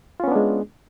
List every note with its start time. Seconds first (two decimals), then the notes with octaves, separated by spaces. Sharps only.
0.20 F4
0.24 C#4
0.28 B3
0.32 D4
0.36 G#3